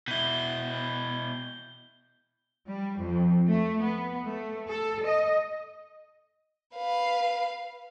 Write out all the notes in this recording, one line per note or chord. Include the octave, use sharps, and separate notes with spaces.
B2 E4 G6 G7
G3
F2
A3
B3
A3
A4
D#5
B4 F5